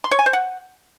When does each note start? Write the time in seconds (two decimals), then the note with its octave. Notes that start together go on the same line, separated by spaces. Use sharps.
0.04 C6
0.11 C#5
0.19 G#5
0.26 C5
0.33 F#5